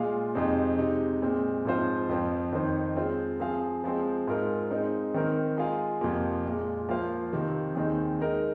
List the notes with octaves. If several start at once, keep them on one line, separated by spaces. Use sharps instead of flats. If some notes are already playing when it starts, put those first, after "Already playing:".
Already playing: A#2 G#3 F4 G#4 F5
F2 C3 G#3 C4 D#4
C3 G#3 D#4
A#2 G#3 C4
G#2 F3 C4 F4 C5
F2 F3 C4
F2 D#3 C4 D#4 C5
G#3 C4 F4 C5
F3 C4 G#4 F5
F3 G#3 C4
G#2 G#3 F4 A#4
G#3 C4 D#4 C5
D#3 C4 D#4 A#4
G#3 F4 G#4 F5
F2 C3 F3 A#3
A#2 G#3 F4
F3 A#3 F4 C5 F5
C3 D#3 C4
D#2 D#3 C4 D#4 G#4
G#3 D#4 A#4 D#5